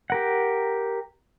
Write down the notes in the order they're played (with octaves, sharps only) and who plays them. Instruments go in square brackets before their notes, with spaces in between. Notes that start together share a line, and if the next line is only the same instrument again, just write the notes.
[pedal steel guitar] G4 A#4 F#5